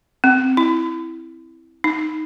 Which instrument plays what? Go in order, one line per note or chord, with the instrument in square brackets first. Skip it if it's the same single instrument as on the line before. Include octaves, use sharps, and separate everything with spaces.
[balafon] C4
E4
D#4